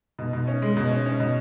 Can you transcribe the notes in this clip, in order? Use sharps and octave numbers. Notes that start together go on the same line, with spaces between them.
B2
B2
C#4
G#3
B2
C#4
C#4
B2